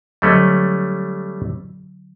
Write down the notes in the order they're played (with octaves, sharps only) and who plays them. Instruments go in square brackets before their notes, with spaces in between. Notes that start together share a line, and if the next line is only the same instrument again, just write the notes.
[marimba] D3 F#3 [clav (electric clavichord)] G3 A3 C#4